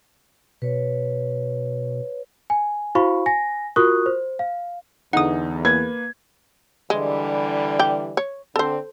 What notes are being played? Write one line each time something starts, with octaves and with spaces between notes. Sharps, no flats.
B2 B4 C#5
G#5
E4 F#4 C5 F5 B5 C#6
G#5 A#6
F4 F#4 A#4 C#6 D#6 F#6
C5
F5
E2 D3 D#4 F#5 D#6
A#3 B4 G#6
D3 E3 G3 G#3
D5 G5
C#5
D3 C4 A4 C5